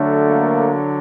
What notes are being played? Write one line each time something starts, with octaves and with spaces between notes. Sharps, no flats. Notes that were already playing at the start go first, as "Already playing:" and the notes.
Already playing: D3 F#3 A3
A#3